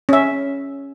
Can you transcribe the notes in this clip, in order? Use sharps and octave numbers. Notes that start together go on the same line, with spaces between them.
C#4 E5